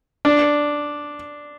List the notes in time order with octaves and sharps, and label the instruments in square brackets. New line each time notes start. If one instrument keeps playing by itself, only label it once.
[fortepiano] D4